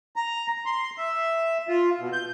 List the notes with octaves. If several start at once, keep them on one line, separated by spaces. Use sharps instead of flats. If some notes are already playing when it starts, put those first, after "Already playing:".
A#5
C6
E5
F4
B2
G6